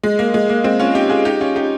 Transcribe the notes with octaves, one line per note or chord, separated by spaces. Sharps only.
G#3
A#3
G#3
A#3
G#3 C4
C#4 F4
D#4 G4
F4 G#4
D#4 G4
C#4 F4
D#4 G4